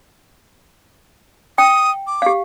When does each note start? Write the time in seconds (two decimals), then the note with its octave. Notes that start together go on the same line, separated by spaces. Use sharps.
1.58 G5 D#6
2.07 D6
2.22 G4 F5